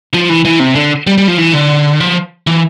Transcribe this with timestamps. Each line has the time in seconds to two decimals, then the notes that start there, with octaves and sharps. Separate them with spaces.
0.14 F3
0.30 E3
0.45 E3
0.60 C3
0.76 D3
1.07 G3
1.18 G3
1.28 F3
1.38 E3
1.53 D3
2.00 F3
2.47 E3